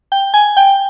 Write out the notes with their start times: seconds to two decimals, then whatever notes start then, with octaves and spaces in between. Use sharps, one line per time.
0.12 G5
0.34 G#5
0.57 G5